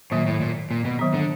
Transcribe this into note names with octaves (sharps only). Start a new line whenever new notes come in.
A#2 D#3 F#3 A#3
A2
A#2
A#2
B2
D#3 F#3 B3
D3